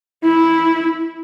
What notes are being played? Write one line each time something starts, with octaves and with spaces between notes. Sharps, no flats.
E4